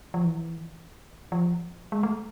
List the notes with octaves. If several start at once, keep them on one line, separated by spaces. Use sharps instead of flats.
F3
E3
F3
G#3
A3